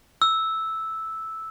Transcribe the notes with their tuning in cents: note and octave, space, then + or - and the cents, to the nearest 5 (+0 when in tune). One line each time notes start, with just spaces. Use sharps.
E6 -5